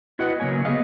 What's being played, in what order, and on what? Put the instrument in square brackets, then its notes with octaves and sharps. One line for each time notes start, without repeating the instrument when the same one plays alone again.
[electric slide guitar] E4 F#4 B4 D#5 F#5
C#3 F#3 A#3 C#5 G#5
A3 B3 G4 G#4 D#5 F5